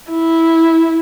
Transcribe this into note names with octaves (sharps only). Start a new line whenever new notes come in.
E4